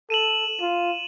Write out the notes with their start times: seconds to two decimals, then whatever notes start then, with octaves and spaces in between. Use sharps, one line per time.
0.10 A4 D#7 E7 F#7
0.61 F4